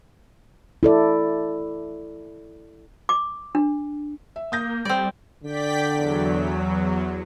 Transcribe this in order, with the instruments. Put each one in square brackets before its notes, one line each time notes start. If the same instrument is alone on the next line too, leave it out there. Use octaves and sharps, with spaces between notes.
[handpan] E4 A4 D5
[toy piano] D6
D4
[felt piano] E5
[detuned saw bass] A#3 [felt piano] D#6 G6 A#6
[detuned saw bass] G3 [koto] C4 D5
[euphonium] D3 [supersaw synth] D5 G5 B6
[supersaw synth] E2 F#3